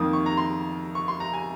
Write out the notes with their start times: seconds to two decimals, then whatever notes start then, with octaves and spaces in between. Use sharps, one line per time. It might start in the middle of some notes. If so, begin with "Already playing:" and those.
Already playing: F2 D#3 A#3 D#6
0.13 C#6
0.26 A#5
0.37 C6
0.95 C#6
1.08 C6
1.20 A#5
1.33 G#5